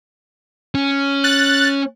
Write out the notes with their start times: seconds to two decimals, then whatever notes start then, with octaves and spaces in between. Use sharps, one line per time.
0.75 C#4
1.24 F#6 A6